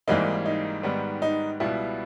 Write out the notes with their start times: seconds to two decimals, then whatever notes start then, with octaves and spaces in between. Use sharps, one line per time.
0.08 G#1 G#2 E3 G3 A#3 D#4
0.46 D#4
0.83 G#2 D#3 G3 B3
1.22 D#4
1.60 C#2 B2 G3 B3 E4